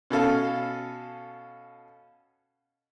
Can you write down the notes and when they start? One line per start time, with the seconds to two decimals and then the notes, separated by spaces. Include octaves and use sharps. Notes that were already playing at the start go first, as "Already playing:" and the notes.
0.10 B2 C#4 A4 F5